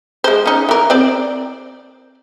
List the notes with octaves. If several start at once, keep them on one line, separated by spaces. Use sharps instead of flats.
G#3 C5
C#4 D#4
E3 A#4
C4 C5 D5